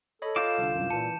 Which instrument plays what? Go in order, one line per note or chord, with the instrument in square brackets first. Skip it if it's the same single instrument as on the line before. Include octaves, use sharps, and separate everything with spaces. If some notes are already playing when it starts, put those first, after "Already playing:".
[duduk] A4 [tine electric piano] C#5 D#5 B5
[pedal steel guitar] F4 F5 D6 [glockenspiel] G6 E7
[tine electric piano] C2 D3
C2 F#2
[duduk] A#2 [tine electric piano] E3 C#7 [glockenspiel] A5